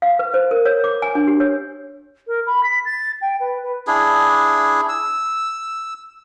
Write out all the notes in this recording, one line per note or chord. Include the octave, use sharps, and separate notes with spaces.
F5
B4
C5
A#4
C#5
D6
G#5
D4
G4
C#5
A#4
B5
B6
A6
G5
B4
B4
D4 E4 G#4
E6